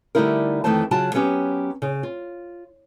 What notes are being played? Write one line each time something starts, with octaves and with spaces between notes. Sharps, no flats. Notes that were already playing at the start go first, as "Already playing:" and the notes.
D3 G3 A3 D#4 E4 A#4
F2 D#3 E3 A3 C5 A5
C#3 F#3 F4 F#4 A5
F#3 B3 C#4 G4
C#3
F4